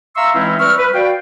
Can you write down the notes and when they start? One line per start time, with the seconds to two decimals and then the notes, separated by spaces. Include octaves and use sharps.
0.16 E5 F5 A#5 C6 C#6 E6
0.34 E3 G#3 C4 C#4 D#4 E4
0.60 G3 B4 C#6 E6 F6
0.79 B4
0.94 F#4 D5 F5 G5